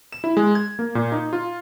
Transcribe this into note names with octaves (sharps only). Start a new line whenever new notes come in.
E7
E4
G#3
G#6
A#3
A#2
D#4
F4